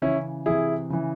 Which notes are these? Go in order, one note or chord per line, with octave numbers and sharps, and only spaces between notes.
C#3 E3 C#4 E4
C3 E3 E4 G#4
C#3 E3